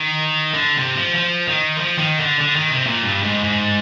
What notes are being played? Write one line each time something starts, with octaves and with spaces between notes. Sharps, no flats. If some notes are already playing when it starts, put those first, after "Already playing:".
Already playing: D#3
D3
C3
F3
F3
D#3
F3
D#3
D3
D3
D#3
C3
A#2
G2
G#2
G#2